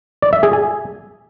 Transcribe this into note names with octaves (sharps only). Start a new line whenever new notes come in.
D5
E5
G#4
G#5